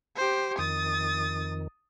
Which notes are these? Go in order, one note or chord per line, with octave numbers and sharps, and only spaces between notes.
G4 C5
F2 D#3 D#6 A6